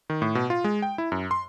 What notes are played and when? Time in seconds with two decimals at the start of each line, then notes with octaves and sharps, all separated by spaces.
0.10 D#3
0.22 A2
0.35 B2
0.50 F4
0.64 G#3
0.82 G5
0.98 E4
1.12 F#2
1.31 C6